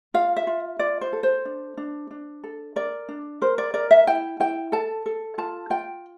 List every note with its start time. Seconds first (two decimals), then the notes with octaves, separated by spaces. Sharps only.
0.14 F4 F5
0.36 E5
0.47 F4
0.79 F4 D5
1.01 C5
1.13 A4
1.23 C5
1.45 D4
1.77 D4
2.11 D4
2.44 A4
2.76 A#4 D5
3.09 D4
3.41 A#4 C5
3.58 D5
3.74 A#4 D5
3.91 E5
4.07 E4 G5
4.40 E4 G5
4.72 A4 A5
5.06 A4
5.38 F4 A5
5.70 F4 G5